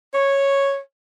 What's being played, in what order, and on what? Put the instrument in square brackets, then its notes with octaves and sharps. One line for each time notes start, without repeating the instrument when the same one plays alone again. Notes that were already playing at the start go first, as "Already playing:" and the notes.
[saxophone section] C#5